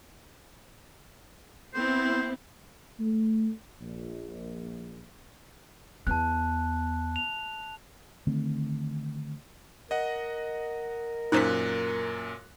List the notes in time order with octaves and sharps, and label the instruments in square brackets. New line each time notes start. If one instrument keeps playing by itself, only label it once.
[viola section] B3 C4 E4 [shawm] C5
[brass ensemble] A3
A#1
[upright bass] E2 B3 [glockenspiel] A5 F#6
[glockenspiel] F7
[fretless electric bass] D3 D#3 A3 C4
[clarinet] A#4 [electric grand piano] D#5 F#5
[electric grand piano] F#2 A#2 F#6 [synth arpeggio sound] D#4 C5 B6